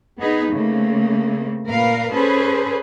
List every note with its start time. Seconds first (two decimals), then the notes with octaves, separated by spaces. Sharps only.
0.18 B3 D#4 G#4 B4
0.52 C#3 A3 A#3 C4
1.69 A#2 A#4 B4 F5
2.12 C#4 G#4 A4 B4 C5